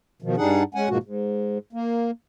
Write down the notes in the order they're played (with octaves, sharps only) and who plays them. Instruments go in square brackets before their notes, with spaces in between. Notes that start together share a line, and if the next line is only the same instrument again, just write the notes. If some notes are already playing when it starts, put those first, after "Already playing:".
[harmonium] B2 D#3 F3
G2 G3 D4 D#4 G#4 F#5
G#3 C#4 F#5 G#5
G#2 B2 F3 G#3 A#3 F#4
G#2
A#3